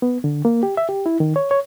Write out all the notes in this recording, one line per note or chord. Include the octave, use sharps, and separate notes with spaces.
B3
D3
A#3
G4
E5
G4
E4
D#3
C#5
C#5